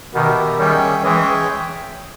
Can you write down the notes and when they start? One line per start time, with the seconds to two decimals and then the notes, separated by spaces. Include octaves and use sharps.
0.13 B2 D#3 B3 G4 A#4 E5
0.58 D#3 G3 C#4 G#4 C#5 E5 G5
1.03 E3 G#3 C#4 G#4 C#5 E5 G5